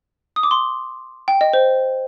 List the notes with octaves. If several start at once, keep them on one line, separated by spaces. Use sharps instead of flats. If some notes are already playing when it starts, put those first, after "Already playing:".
D#6
D6
C6
G5
D#5
C5